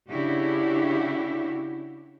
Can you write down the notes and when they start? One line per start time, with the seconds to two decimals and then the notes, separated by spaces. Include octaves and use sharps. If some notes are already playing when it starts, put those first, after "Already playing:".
0.11 C#3 D4 E4 F#4 G4